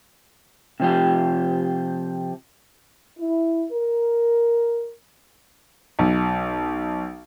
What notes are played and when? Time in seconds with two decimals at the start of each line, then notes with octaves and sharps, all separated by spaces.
0.80 C3 F3 G4
3.19 E4
3.72 A#4
5.99 B1